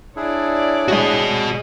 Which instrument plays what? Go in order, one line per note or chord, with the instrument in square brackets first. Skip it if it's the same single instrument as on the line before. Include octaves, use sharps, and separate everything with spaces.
[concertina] D4 E4 G#4 [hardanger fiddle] C#5 D5
[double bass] G#3 [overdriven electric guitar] F#4 D#5